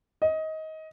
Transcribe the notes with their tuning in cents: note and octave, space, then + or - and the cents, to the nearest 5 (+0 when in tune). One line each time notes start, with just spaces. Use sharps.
D#5 +20